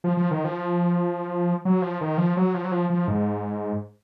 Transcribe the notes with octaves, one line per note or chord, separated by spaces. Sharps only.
F3
F3
D#3
F3
F#3
F3
D#3
F3
F#3
F3
F#3
F3
F3
G#2